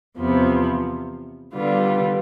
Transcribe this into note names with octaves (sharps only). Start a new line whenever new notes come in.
E2 C3 F3 B3
D3 G3 B3 F4